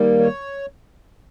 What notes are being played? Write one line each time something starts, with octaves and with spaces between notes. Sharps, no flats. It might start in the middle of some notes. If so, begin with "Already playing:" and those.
Already playing: D#3 G3 A#3
C#5